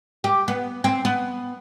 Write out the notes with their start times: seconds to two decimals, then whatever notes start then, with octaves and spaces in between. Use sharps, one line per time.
0.24 G4
0.48 B3
0.84 C4
1.05 B3